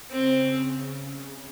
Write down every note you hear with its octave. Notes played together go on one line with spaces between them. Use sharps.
C#3 C4